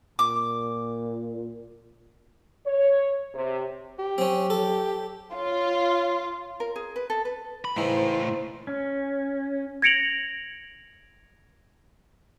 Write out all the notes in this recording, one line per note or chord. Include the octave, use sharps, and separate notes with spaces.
A#2 D6
C#5
C3
G4
F#3 C4 C#4
A4
F4 C#5
A#4
G#4
B4
A4
B4
B5
A2 C#3 E3 D#4 E4 C5
C5
C#4
G#6 A#6 C#7 D7 F7 F#7